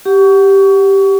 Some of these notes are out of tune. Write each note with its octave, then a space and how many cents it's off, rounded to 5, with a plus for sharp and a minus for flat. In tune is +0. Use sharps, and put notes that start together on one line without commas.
G4 +0 F#5 +15 C#6 +30